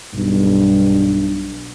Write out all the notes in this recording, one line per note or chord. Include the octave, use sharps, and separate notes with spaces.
B1 G2